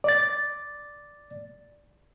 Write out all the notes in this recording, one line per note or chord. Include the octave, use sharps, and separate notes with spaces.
D5 A6